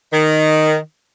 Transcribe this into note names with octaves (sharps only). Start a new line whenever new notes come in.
D#3